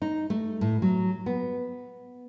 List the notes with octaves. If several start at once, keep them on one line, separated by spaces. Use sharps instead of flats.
D#4
A3
A2
F#3
B3